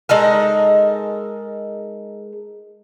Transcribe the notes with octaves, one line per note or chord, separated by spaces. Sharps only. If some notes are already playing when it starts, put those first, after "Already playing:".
G#3 D#4 A4 A#4